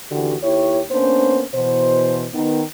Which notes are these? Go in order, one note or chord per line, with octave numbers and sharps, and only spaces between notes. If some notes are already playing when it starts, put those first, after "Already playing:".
D#2 D3 E3 F#4 G4
D#2 E4 G4 C#5
A#3 B3 C#4 D4 C5
B2 E3 C5
D#3 B3